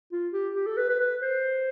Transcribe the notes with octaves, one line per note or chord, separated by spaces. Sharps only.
F4
G4
G4
A4
B4
B4
B4
C5